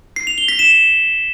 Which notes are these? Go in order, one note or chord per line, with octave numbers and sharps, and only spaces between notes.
C7
F7
G7
B6
E7